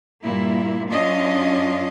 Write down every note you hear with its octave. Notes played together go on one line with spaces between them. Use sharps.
G2 A#2 A#3 E4
F#2 C#4 D4 F4 D#5